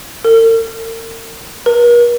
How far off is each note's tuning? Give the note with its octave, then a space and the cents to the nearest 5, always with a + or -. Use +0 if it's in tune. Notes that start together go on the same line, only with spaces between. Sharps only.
A#4 -45
A#4 +45